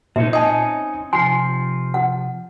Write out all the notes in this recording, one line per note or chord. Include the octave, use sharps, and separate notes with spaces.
A#2 C4 C#4 D#4 E5
D#5 G#5 A5 D#6
C3 F3 G#5 C6 C7
F#5